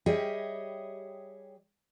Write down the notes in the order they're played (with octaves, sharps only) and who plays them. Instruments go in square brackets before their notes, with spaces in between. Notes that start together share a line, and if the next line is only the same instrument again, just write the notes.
[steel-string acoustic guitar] G3 G4 G#4 C#5 D#5 E5